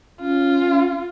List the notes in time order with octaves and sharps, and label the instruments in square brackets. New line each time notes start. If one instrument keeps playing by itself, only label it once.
[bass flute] C#4 [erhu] F4